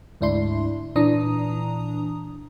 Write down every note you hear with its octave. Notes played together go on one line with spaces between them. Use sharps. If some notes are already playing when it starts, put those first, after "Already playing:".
D2 G#2 D4 E4 C6
A#2 E3 D4 A#5 D#6